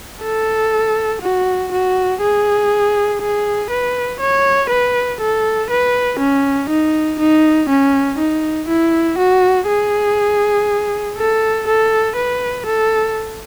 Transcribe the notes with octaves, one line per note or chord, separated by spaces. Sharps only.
A4
F#4
F#4
G#4
G#4
B4
C#5
B4
A4
B4
C#4
D#4
D#4
C#4
D#4
E4
F#4
G#4
A4
A4
B4
A4